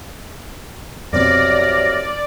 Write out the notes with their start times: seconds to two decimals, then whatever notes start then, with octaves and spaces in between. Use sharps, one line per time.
1.13 C2 F2 B2 F#3 C4 D5 F6 A#6